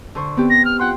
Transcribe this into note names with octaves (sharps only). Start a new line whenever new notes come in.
D3 C5 C#6
B3 C4 G4
A#6
F6
F4 F#5 G5 C6